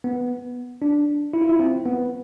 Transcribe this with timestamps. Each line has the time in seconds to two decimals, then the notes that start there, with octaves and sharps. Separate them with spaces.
0.04 B3
0.82 D4
1.33 E4
1.41 F4
1.49 E4
1.59 C4
1.85 B3